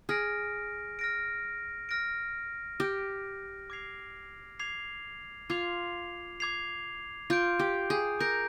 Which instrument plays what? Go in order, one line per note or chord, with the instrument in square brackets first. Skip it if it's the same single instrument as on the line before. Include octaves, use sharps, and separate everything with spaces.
[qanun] G#4 [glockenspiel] F6 A#6 D7
[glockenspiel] F6 A#6 D7
F6 A#6 D7
[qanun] G4 [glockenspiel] F6 A#6 D7
[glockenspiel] D6 G#6 C7 F7
D6 G#6 C7 F7
[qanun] F4 [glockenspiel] D6 G#6 C7 F7
[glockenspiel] D6 G#6 C7 F7
[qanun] F4 [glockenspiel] D6 G6 D7
[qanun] G4
G#4
[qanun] A#4 [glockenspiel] D6 G6 D7